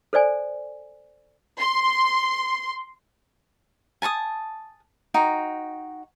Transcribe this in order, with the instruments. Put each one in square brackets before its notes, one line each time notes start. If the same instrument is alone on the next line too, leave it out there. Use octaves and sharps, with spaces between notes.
[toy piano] A4 C5 D5 G#5
[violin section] C6
[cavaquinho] G#5 A5 C6 D#6
D#4 F#4 G5